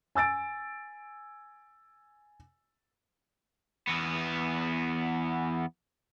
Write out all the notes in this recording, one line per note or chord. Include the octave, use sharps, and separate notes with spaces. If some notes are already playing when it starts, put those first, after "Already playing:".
G#5 E6 A6 D7
E2 B3